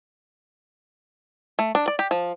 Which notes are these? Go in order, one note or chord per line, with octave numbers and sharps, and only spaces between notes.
A3
D4
D5
G4
F3